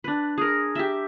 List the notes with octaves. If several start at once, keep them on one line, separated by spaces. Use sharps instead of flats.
D4 B4
G#4 A#4
G4 E5